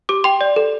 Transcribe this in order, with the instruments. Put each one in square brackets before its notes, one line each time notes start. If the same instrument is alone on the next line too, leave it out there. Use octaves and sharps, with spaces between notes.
[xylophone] G4 D6
G5 C6
D5
A4